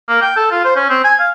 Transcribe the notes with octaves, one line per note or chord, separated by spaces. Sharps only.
A#3
G5
A4
F4
C5
C#4
C4
G#5
F5